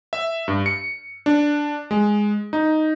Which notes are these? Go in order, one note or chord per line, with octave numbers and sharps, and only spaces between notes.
E5
G2
C#7
D4
G#3
D#4